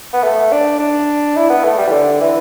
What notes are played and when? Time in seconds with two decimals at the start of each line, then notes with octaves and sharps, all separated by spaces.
0.13 B3
0.24 A3
0.52 D4
0.80 D4
1.37 E4
1.50 B3
1.65 A3
1.78 G3
1.88 E3
1.92 D3
2.21 E3